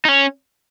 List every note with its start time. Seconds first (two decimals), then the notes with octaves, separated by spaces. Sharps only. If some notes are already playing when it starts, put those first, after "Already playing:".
0.05 D#4
0.08 C#4